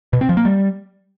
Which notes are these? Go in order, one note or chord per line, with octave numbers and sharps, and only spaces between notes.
B2
C4
F3
A#3
G3